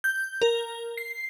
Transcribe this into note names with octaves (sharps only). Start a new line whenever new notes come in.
G6
A#4
C7